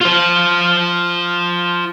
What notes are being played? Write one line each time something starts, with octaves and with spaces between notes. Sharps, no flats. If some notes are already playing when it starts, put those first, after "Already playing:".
F4 C5